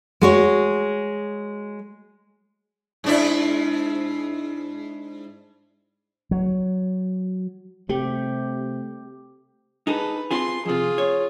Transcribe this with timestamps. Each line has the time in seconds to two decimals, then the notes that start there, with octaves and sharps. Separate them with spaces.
0.21 G#3 F#4 C#5
3.04 G#2 D4 E4
6.31 F#3
7.89 C3 A3 G4
9.87 D#4 G#4 A4 B4
10.31 C4 F4 G#4 C6
10.65 F2 C3 F4 G#4
10.98 C#5